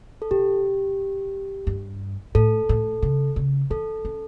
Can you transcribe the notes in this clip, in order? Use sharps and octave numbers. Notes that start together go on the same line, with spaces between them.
A4
B2 G4
G2
A2 A4
A2
C#3
C#3
E3 A4
C#4